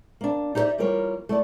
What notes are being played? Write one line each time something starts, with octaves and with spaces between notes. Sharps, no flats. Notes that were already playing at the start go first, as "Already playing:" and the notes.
A#3 D4
D#4 G4 A4 C#5 D5 E5
E3 G3 A#3 F4 A#4 C#5
A3 E4 D5